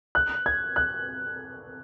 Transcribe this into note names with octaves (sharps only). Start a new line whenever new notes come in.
F#6
G#6
F#6